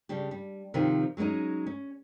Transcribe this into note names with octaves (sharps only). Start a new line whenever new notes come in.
C#3 G3 D4 G4
G3
C3 D#3 F3 C4 D#4 F4
F#3 G#3 B3 C#4 D#4
C#4